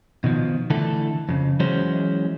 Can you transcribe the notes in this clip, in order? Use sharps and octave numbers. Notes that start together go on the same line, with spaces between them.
B2 D#3 F3
D3 E3 A3 A4
F2 C#3
E3 F#3 G#3 C#4 C5